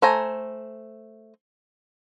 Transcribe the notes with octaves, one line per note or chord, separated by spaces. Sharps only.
A3 C5 G#5 A#5